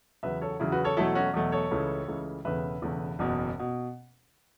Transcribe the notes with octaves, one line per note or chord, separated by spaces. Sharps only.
E2 C#3 F#3 B4 E5
A4 C#5
E2 C#3 F#3 E4
F#4 B4
A4 C#5
E2 B2 F#3 A3 E4 A4
C#4 F#4
E2 B2 F#3 A3
A4 C#5
C#2 C#3 E3 A3
C#2 C#3 E3 A3
E1 E2 C#3 A3 B4 E5
E1 E2 C#3 A3
F#1 E2 B2
B2